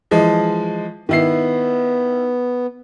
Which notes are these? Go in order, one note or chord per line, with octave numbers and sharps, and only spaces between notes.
E3 F3 G#3
D#3 B3 E4 C7